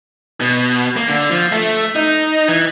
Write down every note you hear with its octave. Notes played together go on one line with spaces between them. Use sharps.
B2
A#3
D3
F3
A3
D#4
E3